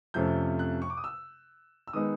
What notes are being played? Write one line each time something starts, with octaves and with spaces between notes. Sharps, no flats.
F2 C3 F3 A3 C#4 G6
F#6
C#6
D6
D#6
E6
E6
D#3 G#3 B3 D#4 D#6